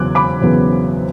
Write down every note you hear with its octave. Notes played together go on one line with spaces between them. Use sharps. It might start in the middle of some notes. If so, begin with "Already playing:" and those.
Already playing: E2 C#3 F#3 B3 D6 F#6 G#6
B5 D6
E2 C#3 F#3 B3